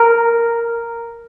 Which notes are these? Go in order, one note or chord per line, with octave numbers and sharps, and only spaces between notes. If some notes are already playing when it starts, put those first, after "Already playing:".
Already playing: A#4